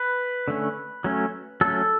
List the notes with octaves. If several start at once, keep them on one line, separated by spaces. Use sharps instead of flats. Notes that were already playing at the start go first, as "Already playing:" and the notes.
Already playing: B4
D3 A3 C#4
F#3 A3 C#4
F#3 A3 C#4 A4